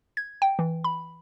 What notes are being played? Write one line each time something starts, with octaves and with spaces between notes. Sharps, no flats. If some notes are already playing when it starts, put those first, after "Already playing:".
G#6
G5
E3
B5